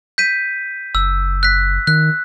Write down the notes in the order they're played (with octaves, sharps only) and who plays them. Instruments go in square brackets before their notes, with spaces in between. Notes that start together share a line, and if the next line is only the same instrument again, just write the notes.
[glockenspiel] G6 B6 D#7
[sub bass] F#1 [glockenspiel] E6
[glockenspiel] F#6 B6
[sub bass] D#3 [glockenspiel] F#6